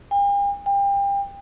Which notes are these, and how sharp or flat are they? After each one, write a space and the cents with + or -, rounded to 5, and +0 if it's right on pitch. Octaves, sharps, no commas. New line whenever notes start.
G5 +45
G5 +30